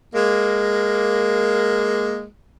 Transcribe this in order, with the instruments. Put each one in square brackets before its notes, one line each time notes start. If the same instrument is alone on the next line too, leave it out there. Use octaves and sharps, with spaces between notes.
[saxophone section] G#3 A#3